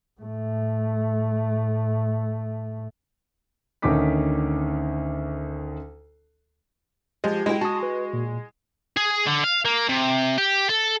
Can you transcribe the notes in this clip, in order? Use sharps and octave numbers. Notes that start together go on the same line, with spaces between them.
A2 A3
D2 D#3 C#4 D#4 D6 B6
F3 G#3 G4
G#3 E4 F#4 G5
F#4 A5 D#6
B4
A#2
G#4
D3
F5
A#3
C3
G4
A4